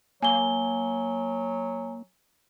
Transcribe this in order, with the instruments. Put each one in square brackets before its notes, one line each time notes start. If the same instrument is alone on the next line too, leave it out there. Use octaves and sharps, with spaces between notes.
[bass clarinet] F#3 [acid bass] A#3 [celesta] G#5 G7